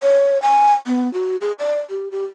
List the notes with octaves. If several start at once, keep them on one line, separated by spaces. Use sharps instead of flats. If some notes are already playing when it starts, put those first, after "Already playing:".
C#5
G#5
B3
F#4
G#4
D5
G4
G4